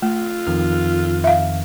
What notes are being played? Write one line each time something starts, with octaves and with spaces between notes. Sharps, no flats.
A3 F4
F2 D#3 F6
E5 F5